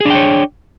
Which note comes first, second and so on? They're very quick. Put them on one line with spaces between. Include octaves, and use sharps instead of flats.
G#4 D4 G5 C#5